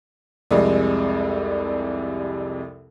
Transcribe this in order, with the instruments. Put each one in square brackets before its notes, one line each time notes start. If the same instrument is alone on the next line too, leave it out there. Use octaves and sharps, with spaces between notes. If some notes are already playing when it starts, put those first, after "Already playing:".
[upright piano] C2 F2 C3 G3 G#3